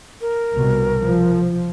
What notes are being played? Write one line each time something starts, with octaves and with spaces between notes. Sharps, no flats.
A#4
C2 B2
F3